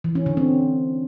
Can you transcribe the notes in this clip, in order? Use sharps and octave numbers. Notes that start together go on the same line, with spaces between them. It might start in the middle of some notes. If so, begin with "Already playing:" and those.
E3
C#4
D3
C4